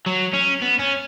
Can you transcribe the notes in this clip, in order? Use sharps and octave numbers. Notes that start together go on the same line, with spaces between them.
F#3
C#4
B3
C#4